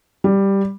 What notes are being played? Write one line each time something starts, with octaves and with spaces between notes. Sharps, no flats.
G3